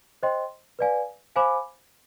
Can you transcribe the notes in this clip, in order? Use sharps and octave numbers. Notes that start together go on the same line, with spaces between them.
C5 D#5 G5 C6
B4 D5 F5 G#5
C5 F5 G#5 B5 D6